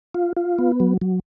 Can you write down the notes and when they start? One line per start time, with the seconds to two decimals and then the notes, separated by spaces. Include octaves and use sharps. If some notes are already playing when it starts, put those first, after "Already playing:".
0.14 F4
0.37 F4
0.59 B3
0.80 F#3
1.01 F#3